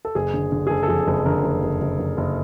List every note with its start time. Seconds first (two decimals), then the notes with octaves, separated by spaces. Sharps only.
0.05 A4
0.15 F#1 G#4
0.34 D3
0.52 D3
0.67 G#4
0.70 F#1 A4
0.83 A4
0.88 F2 G#4
1.07 F#1 A4
1.26 D3 A#4
1.43 F#1
1.63 F#1
1.81 F#1
1.99 F#1
2.17 F#1